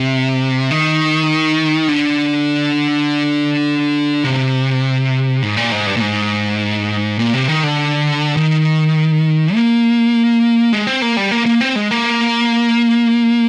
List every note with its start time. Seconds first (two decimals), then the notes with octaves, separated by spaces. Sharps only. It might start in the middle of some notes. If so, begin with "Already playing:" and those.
Already playing: C3
0.71 D#3
1.88 D3
4.24 C3
5.42 G#2
5.57 A#2
5.72 G#2
5.86 G2
5.97 A#2
6.01 G#2
7.19 A#2
7.34 C3
7.48 D#3
7.63 D3
8.37 D#3
9.54 A#3
10.73 G#3
10.87 C4
11.02 A#3
11.17 G3
11.31 A#3
11.46 A#3
11.61 C4
11.76 G#3
11.91 A#3